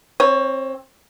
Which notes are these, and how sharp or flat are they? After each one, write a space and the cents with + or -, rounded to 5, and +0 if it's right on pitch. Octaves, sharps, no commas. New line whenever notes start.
C4 +25 C#5 +0